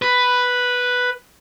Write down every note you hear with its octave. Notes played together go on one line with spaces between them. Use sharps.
B4